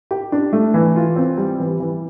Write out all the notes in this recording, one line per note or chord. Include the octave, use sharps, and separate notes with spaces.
G4
D4
A3
E3
F4
C4
G3
E3
E3